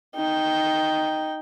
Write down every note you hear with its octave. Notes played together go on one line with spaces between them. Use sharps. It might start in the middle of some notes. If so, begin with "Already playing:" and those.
D#4 G5